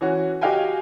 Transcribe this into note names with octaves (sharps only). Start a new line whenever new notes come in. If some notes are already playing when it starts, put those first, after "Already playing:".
E3 C#4 F#4
F#4 G4 D#5 F5 G5 G#5